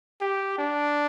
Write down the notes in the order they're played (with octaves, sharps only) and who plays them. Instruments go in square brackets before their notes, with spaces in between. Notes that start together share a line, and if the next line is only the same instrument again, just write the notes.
[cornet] G4
D4